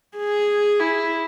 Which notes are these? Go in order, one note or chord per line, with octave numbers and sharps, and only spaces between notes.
G#4
E4